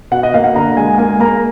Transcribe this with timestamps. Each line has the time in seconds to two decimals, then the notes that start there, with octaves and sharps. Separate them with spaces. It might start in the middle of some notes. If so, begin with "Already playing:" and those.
0.12 B2 F#5
0.23 D#5
0.34 A#3 F5
0.44 F#5
0.55 D3 A#5
0.77 G#3 G#5
0.98 A#3 G#5
1.19 A#3 A#5